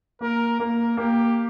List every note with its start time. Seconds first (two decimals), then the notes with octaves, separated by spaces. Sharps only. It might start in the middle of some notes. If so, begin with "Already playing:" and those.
0.21 A#3 A#4
0.60 A#3 A#4
0.97 A#3 G4